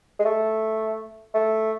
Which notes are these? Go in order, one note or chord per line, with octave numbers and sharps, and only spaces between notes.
G#3
A3
A3